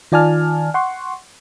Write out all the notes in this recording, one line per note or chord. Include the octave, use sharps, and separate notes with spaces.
D#3 F4 D5 G#5 A5 F6
F#5 C6 C#6